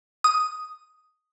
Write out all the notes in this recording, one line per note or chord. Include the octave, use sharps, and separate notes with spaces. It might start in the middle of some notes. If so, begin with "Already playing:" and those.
D#6